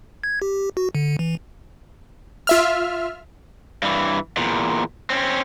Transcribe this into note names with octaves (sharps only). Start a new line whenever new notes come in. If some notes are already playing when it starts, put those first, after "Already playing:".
G#6
G4
F#4
D3
E3
F4 E5 F6
G2 E3
E2 A#2
C4 C#4